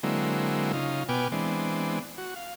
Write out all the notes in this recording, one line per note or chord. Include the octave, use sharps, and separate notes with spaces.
D3 F#3 G#3 A#3 C4 E4
C#3 D#4 F4
B2 B3 G5 G#5 D6 F6
E3 G#3 B3 C4 D4
F#4
F5